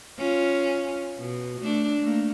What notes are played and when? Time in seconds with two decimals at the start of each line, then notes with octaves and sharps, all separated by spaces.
0.18 C#4 F4
1.18 B2
1.61 A3 D4
2.01 A3 A#3